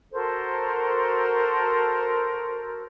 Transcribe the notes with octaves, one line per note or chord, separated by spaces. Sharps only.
F#4 A4 A#4 C5